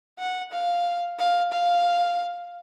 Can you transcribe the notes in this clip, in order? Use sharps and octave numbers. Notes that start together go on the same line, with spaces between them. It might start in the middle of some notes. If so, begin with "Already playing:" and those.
F#5
F5
F5
F5